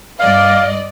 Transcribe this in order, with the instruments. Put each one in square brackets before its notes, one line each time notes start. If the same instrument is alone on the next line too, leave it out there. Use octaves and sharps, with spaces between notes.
[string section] G2 D5 D#5 [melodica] F5